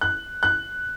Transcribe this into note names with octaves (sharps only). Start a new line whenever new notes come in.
F#6
F#6